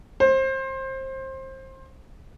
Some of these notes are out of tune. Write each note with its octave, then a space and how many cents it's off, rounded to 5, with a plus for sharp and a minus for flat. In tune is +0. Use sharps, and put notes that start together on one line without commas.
C5 +25